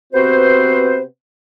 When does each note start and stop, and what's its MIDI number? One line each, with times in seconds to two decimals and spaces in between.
0.13 1.02 48
0.13 1.02 59
0.13 1.02 60
0.13 1.02 66
0.13 1.02 71
0.13 1.02 72